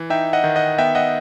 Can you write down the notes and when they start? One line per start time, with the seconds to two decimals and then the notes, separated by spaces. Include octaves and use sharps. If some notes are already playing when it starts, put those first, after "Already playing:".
Already playing: E3
0.10 D#4 E5 G5
0.33 D#5 F#5
0.44 D#3
0.56 D#5 F#5
0.78 B3 E5 G5
0.95 D#5 F#5